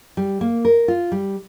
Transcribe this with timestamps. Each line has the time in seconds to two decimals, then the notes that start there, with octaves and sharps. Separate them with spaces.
0.17 G3
0.41 A#3
0.65 A#4
0.88 F4
1.12 G3